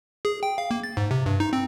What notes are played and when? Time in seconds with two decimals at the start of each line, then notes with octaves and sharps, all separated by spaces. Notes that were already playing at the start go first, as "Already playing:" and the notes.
0.25 G#4
0.43 G5
0.58 F5
0.71 A#3
0.84 A6
0.97 G#2
1.11 C3
1.26 G2
1.40 D#4
1.53 C4